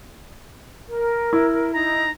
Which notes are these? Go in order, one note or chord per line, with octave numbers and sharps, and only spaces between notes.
A#4
E4
D#4 A#5